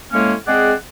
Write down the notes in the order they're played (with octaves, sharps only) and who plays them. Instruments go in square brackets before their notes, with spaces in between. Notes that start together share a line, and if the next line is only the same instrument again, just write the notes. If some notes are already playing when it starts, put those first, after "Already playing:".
[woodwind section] A2 G#3 A#3 C#4
G#3 C4 G#4 D5 F#5